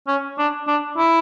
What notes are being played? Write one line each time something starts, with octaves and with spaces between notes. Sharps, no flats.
C#4
D4
D4
E4